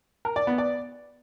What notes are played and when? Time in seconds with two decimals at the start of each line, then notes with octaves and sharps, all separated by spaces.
0.25 A#4
0.36 D5
0.47 B3
0.58 D5